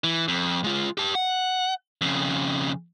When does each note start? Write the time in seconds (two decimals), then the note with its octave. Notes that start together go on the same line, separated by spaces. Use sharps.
0.04 E3
0.28 F2
0.64 G#3 F4
0.98 G4 A5
1.15 F#5
2.01 F2 C#3